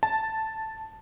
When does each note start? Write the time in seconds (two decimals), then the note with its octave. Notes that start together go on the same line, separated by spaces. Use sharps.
0.03 A5